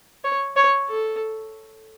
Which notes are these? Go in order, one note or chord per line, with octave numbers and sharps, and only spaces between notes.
C#5
C#5
A4